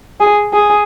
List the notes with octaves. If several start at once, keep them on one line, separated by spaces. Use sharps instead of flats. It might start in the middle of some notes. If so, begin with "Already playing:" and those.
G#4
G#4